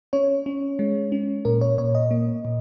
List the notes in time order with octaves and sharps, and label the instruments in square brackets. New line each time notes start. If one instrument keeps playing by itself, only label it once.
[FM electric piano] C#4 C#5
C#4
G#3
C#4
A#2 A#4
C#5
A#2 C#5
D#5
A#3
A#2